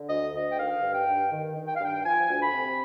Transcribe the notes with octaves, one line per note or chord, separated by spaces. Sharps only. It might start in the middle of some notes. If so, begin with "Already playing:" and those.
Already playing: D3
D2 D#5
D2 D#5
G5
D#3 F5
G2
G5
G2
D#3
D#3
G5
F5
G2 G5
F3 G#5
D2
B5
C3